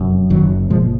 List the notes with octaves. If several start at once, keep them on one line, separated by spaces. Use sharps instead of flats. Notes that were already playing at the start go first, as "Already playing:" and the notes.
Already playing: F1 F#2
F#1 D#3 F#3
A#2 F3 G#3